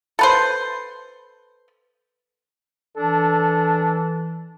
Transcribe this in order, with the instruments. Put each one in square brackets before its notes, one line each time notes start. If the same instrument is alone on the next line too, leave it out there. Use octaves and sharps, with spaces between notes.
[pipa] A4 B4 C5
[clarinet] E3 [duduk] D4 [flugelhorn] A4